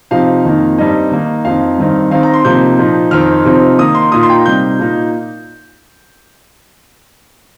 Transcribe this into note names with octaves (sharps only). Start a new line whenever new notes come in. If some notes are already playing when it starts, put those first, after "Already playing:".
C3 F3 D#4 F5
F2 D#3 A#3 D#4
G2 G3 C4 D#4 D#5
D#3 A#3 D#4
F2 F3 D#4 F5
G2 D#3 C4 D#4
D#3 C4 D#4 F5
A#5
C6
C3 F3 A#3 D#4 G6
A#2 F3 D#4
F2 D#3 C4 D#4 F6
C3 F3 C4 D#4
D#3 A#3 D#4 D#6
C6
A#2 A#3 D#4 D#6
C6
G5
A#5
C3 G3 D#4 G6
A#2 A#3 D#4